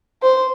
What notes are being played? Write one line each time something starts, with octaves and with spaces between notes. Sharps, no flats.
C5